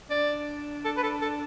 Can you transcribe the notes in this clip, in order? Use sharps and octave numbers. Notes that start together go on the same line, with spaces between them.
D4 D5
A4
B4
A4
A4